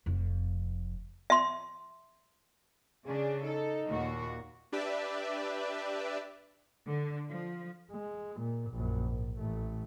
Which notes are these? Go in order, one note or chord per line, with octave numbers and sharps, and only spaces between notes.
F1 F2
E5 C6
C#3 D4 G#4
D#4 A4
D#2 A#2 F#4
D4 G4 B4 D5 E5
D3
F3
G#3
A#2
A#1 F#2
G#2
A1 A3